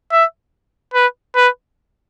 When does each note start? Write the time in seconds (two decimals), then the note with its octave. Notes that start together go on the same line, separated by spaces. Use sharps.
0.12 E5
0.94 B4
1.36 B4